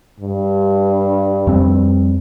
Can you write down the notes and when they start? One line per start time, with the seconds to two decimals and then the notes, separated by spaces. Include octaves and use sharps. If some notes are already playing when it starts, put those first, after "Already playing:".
0.20 G2
1.47 F2 G3 C4